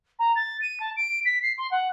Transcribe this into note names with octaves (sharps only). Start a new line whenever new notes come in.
A#5
A6
D#7
A5
D7
B6
C7
C6
F#5